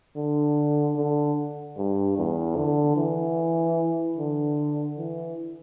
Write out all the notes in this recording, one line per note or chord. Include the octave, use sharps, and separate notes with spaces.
D3
D3
G2
E2
D3
E3
D3
E3